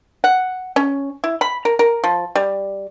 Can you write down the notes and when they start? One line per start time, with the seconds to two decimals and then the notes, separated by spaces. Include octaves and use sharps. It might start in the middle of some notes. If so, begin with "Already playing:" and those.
0.24 F#5
0.76 C#4
1.24 E4
1.41 B5
1.65 A#4
1.79 A#4
2.04 F3
2.35 G3